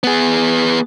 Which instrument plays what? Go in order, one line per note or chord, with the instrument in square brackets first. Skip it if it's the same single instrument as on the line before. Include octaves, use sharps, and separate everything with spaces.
[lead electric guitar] B3 G#4